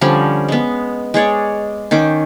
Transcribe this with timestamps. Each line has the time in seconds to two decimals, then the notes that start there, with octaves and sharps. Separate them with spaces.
0.01 D3 F3 G3 C#4
0.49 G#3 B3
1.14 G#3 G#4 C#5 D5
1.91 D#3 C#4 G5 D6